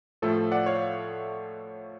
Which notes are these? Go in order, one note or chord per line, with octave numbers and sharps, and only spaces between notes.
A2 F3 A3 A4
D5 F#5
C#5 F5